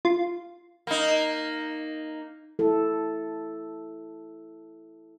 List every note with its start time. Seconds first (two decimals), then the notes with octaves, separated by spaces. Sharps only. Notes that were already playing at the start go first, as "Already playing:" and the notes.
0.05 F4
0.87 A#3 D#4
2.59 E4 A4